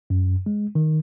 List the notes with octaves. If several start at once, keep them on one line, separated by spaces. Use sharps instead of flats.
F#2
G#3
D#3